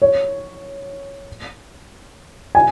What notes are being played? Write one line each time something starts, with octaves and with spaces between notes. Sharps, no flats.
C#5
G#5